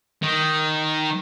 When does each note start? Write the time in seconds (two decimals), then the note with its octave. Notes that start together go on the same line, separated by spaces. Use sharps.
0.22 D#3